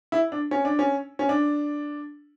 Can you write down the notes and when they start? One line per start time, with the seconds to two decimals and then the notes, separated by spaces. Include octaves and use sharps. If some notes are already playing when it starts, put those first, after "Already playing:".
0.12 E4
0.32 D4
0.51 C#4
0.65 D4
0.79 C#4
1.19 C#4
1.29 D4